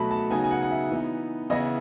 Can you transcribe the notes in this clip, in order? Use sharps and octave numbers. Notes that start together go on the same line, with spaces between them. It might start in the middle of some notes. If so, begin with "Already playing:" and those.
Already playing: B2 F#3 A3 A5 B5
A5
C#3 F#3 B3 D#4 G#5
G#5
F#5
F#5
E5
E3 B3 D#4
C#3 E3 B3 E4 D#5